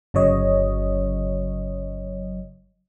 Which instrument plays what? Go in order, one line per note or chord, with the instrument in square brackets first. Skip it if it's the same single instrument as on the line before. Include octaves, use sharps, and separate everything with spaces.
[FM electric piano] G1 C#3 F#3 C#5 D#5